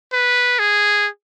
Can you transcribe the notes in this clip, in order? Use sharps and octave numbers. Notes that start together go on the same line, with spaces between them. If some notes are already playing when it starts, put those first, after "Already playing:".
B4
G#4